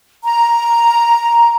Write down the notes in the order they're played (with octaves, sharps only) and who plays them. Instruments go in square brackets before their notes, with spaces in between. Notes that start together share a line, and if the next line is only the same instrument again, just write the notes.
[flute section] A#5